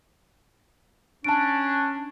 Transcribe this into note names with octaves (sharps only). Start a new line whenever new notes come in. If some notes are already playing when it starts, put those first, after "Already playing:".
C#4 D4 A5 D7